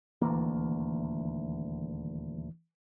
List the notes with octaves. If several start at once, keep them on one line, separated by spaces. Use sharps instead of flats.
D#1 D2 E3 A#3